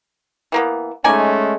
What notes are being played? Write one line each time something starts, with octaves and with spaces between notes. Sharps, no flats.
E3 A#3 B3
G#3 A3 C#4 D#4 D5 G#5